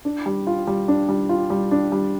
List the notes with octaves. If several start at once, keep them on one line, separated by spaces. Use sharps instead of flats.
D4
G3
F4
G3
D4
G3
F4
G3
D4
G3